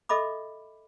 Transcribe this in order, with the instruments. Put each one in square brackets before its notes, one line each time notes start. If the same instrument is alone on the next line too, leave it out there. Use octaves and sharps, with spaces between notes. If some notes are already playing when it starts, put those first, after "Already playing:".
[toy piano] A4 D#5 E5 B5 D6